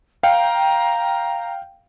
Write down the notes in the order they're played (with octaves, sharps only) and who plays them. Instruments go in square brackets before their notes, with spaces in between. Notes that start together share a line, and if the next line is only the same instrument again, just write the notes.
[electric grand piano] F5 G5 [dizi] A#5